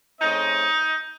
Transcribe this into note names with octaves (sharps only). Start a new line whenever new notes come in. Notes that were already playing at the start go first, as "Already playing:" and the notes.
C#3 A3 C4 D#4 D#5